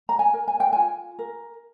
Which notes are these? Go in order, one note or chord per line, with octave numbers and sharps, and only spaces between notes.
A#5
G#5
A#4
G#5
G5
F4 G#5
A#4